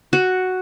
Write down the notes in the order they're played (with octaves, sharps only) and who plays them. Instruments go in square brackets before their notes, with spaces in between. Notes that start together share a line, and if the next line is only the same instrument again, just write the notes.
[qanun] F#4